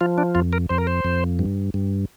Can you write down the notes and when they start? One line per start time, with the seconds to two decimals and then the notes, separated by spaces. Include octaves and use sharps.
0.01 F3 F4
0.18 D4
0.35 F2 F4
0.53 A#4
0.69 F2 C5
0.78 A#4
0.87 C5
1.05 F2
1.39 G2
1.74 G2